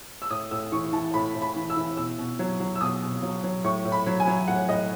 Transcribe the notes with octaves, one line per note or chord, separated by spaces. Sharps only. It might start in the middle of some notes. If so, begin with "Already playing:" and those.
E6
A2 D#6
A2 E6
E3 C#6
E3 A5
A2 B5
A2
B5
E3
E6
E3
B2 E6
B2
F#3
F#3
E6
B2 D#6
B2
F#3
F#3
A2 C#6
A2
B5
F#3
G#5
F#3
A2 F#5
A2 D#5